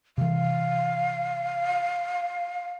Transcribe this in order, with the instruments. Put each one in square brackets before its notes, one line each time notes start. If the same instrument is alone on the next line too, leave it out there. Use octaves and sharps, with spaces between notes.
[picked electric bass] C3 E3 [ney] F5